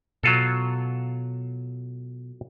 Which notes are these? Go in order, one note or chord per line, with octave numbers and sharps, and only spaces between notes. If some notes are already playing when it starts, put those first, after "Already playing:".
B2 F#3 F4 A4